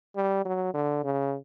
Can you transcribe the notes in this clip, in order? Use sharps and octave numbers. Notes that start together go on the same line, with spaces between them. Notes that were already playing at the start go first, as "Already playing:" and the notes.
G3
F#3
D3
C#3